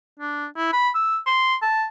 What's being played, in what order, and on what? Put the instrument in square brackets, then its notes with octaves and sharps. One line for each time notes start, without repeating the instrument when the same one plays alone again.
[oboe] D4
E4
B5
E6
C6
A5